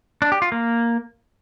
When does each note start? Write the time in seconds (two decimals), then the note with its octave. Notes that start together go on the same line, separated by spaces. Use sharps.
0.22 D4
0.32 G4
0.42 F4
0.52 A#3